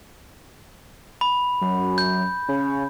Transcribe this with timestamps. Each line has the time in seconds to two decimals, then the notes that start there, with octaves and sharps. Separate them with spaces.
1.21 B5
1.61 F#2
1.98 G6
2.48 C#3